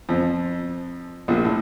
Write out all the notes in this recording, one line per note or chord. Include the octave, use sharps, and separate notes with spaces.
F2 F3
A#1 A#2
A2